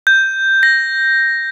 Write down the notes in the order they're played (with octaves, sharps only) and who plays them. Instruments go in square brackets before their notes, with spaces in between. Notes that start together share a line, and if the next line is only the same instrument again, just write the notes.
[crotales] G6
A#6